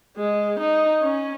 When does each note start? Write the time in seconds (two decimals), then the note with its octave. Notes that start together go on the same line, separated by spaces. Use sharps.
0.17 G#3
0.60 D#4
1.02 C#4